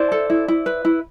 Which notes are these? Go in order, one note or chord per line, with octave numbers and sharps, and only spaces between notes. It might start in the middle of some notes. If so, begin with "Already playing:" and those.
Already playing: E4 C5 D5
A4
E4
E4
B4
E4